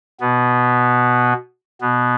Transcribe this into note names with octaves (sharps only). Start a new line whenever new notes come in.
B2 B3
B2 B3